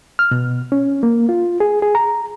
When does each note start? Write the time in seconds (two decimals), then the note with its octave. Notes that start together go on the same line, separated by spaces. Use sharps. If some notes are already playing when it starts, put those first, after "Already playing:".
0.19 F6
0.31 B2
0.72 C#4
1.03 A#3
1.29 F4
1.60 G#4
1.82 G#4
1.95 A#5